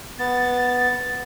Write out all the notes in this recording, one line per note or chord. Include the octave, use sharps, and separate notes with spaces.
B3 A6